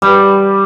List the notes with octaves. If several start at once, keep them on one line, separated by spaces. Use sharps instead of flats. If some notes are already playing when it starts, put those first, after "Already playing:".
G3